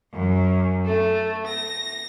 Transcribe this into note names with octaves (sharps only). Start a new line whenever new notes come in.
F#2
A3
A#6